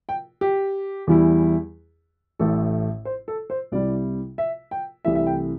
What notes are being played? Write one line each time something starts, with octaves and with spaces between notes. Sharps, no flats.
G5
G4
E2 E3 G3 E4
A1 A2 A3 A4
C5
A4
C5
C2 C3 G3 E4 D5
E5
G5
C2 C3 E3 A3 E4 E5
E5
G5